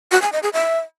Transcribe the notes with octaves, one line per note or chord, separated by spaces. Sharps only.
F#4
G#5
D#5
G#4
E5